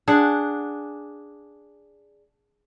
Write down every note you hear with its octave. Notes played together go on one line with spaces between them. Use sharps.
D4 G#4 F#5